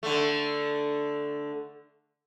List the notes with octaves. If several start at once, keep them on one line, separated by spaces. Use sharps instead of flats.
D3 A3